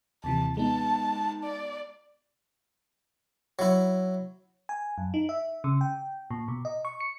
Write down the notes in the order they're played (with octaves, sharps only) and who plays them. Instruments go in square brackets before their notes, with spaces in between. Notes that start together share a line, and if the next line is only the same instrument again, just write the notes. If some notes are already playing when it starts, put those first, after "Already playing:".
[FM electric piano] D#2 C3 E3 [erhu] A5
[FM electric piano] G#3 B3 D#4 [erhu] A5
[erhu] D5
[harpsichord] F#3 E4
[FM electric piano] G#5
F#2
D#4
E5
C#3
G5
A#2
B2
D#5
C#6
C#7